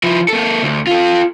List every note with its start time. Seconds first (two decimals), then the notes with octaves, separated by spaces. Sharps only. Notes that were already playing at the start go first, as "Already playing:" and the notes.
0.03 F3 E4
0.28 A#3 A4
0.63 D2
0.87 F4 A4